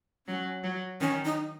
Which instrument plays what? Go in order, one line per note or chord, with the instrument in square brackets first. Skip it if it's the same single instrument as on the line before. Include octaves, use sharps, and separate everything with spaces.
[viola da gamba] F#3 [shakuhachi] C#4
[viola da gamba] F#3
[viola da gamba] D#3 [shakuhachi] C#4
[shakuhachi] D#4